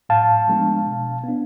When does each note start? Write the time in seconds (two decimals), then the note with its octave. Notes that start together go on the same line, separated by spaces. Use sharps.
0.09 A2 F5 A5
0.48 F3 G#3 B3 D4
0.86 B2
1.24 B3 D4